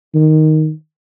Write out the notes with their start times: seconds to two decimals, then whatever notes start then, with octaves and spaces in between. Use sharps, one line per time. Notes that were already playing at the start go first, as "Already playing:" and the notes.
0.15 D#3